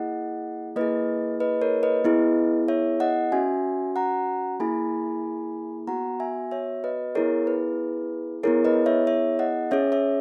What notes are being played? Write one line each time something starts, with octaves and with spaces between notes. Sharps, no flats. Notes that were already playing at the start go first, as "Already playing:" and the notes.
Already playing: A#3 E4 G#4 D#5 F#5
A#3 E4 G#4 B4 D#5
B4 D#5
A#4 C#5
B4 D#5
B3 E4 G#4
C#5 E5
D#5 F#5
C#4 F#4 E5 G#5
F#5 A#5
A#3 E4 G#4 G#5 B5
B3 F#4 F#5 A#5
E5 G#5
C#5 E5
B4 D#5
B3 E4 G#4 A#4 C#5
B4
B3 E4 G#4 A#4 C#5
B4 D#5
C#5 E5
C#5 E5
D#5 F#5
C#4 G#4 C#5 E5
C#5 E5